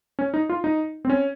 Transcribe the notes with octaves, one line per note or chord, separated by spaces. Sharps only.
C#4
D#4
F4
D#4
C4
C#4